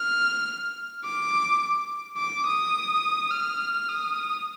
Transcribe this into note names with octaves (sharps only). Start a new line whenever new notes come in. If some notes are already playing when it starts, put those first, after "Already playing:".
Already playing: F6
D6
D6
D#6
F6
D#6